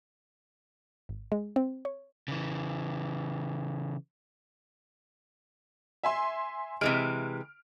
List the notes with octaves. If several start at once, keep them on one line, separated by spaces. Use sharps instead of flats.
G#1
G#3
C4
C#5
C#3 E3
E5 G#5 C6
C3 E3 G#3 F6 D7